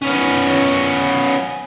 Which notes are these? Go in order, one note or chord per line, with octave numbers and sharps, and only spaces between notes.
B3 C#4